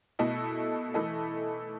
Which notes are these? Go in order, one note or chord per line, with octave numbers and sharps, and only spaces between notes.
B2 A3 E4 A4 D#5
E3 A3 E4 A4 D#5